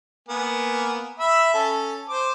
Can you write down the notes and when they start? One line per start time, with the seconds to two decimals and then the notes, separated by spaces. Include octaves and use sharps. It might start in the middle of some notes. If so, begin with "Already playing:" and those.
0.29 A#3 B3 G#5
1.20 E5 B5 E6
1.54 C#4 A4
2.09 C5 D6